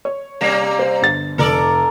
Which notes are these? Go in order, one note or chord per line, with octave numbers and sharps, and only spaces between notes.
C#5
C3 G3 A#3
C5
G1 A6
F1 A4 A#4 D5